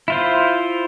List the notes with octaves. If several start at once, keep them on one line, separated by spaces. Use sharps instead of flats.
E4 F4 C5